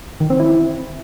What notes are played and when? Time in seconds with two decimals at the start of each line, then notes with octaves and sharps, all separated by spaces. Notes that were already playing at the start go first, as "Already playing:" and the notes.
0.20 D#3
0.30 C4
0.40 E4